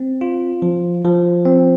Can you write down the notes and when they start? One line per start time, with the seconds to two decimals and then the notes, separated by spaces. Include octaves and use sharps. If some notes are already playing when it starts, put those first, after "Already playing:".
Already playing: C4
0.21 F4
0.62 F3
1.05 F3
1.45 C4